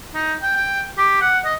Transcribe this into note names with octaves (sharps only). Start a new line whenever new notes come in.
D#4
G5
G5
G4
F#5
D#5